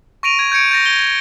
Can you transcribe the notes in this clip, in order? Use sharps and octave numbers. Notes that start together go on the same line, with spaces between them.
C#6 A#6 D7 D#7 F7
G#6
G6 G#6 C#7 D7
G6 A6 A#6
G7